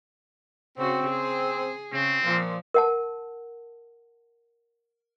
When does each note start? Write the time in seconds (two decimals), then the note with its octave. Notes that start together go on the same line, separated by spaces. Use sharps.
0.78 C#3 C4 F#4
1.10 G#4
1.93 C#3 C4
2.25 A#2 F3
2.74 A#4 F#5 A5